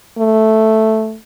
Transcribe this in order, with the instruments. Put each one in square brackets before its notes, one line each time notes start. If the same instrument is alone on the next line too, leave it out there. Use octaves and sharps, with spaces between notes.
[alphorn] A3